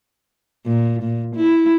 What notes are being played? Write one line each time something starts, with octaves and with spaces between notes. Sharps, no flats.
A#2
A#2
E4